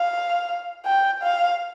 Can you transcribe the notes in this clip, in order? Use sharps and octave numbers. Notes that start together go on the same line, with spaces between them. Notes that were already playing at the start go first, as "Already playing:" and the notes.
Already playing: F5
G5
F5